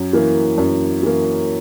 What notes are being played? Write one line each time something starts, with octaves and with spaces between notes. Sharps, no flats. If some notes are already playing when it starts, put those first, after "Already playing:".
Already playing: F#2
E3 A#3
F#2
E3 A#3